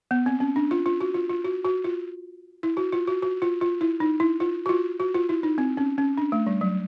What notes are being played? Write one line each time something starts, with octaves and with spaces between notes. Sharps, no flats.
B3
C4
C#4
D4
F4
F4
F#4
F4
F4
F#4
F#4
F4
E4
F#4
F4
F#4
F#4
F4
F4
E4
D#4
E4
F4
F#4
F4
F#4
F4
E4
D#4
C4
C#4
C#4
D4
A3
G3
F#3